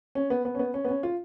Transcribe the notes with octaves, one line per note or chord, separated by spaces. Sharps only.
C#4
B3
B3
C#4
B3
C#4
B3
C#4
F4